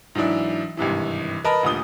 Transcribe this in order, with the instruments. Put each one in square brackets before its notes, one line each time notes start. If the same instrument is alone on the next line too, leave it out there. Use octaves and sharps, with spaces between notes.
[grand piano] G#2 E3 F#3 D4 E4
G#1 G2 C3 E3
A#4 B4 D#5 A5 B5
D#1 D2 A#2 D#6 G7